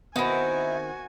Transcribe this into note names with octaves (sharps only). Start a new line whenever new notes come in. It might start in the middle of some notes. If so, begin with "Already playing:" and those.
D#3 B3 C4 D#4 E4 F#4 G#5